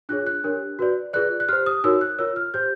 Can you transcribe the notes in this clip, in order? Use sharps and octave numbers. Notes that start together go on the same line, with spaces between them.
D4 F4 G#4 C#5 F#6
F#6
D4 G4 A#4 C#5
F#4 B4 D5
F4 G#4 B4 D5 F#6
F#6
G4 C5 F6
D#6
D#4 F#4 A#4 C#5 E6
F#6
F4 A#4 C#5 E6
F6
G4 C5 G6